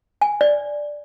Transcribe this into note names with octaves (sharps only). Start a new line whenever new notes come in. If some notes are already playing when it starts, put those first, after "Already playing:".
G#5
D5